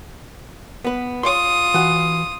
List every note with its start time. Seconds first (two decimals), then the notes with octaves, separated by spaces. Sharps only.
0.84 B3 B4
1.23 F4 C#5 C6 D#6
1.74 E3 F#4